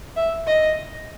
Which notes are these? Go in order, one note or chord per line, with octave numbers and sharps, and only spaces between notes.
E5
D#5